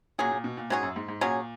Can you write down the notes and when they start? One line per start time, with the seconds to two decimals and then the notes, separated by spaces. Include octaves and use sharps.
0.18 A#2 F#3 C#4 G#4
0.31 A#2
0.44 B2
0.57 A#2
0.70 G#2 F#3 C#4 G#4
0.83 F#2
0.96 G#2
1.08 G#2
1.21 A#2 F#3 C#4 G#4